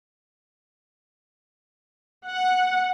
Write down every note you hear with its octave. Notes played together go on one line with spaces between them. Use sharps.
F#5